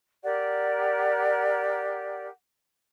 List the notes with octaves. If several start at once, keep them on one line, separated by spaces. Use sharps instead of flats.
G4 A#4 D5 F#5